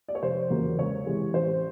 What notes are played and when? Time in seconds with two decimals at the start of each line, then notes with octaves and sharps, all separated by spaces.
0.08 D5
0.15 C#5
0.22 F1 C5
0.50 E2 C#3 F#3 A#3
0.78 C#2 C#5
1.06 C3 E3 G#3
1.34 A1 C5